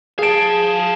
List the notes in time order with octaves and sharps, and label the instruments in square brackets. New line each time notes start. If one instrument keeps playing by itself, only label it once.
[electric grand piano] G#4 D7 [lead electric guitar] F5 A5